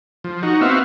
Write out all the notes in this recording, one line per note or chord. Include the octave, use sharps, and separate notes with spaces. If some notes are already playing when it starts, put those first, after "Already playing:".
F3
D#4 F#4
B3 C4 F#4 E5 F5